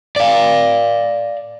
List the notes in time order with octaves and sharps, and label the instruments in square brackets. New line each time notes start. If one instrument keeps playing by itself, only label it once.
[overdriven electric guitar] D5 F5